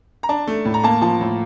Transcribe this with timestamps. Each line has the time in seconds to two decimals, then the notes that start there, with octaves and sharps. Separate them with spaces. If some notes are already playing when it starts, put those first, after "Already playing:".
0.23 A#5
0.29 D4 A5
0.47 A3
0.65 A2
0.74 A#5
0.84 A#3 A5
1.01 F3 A5
1.21 A2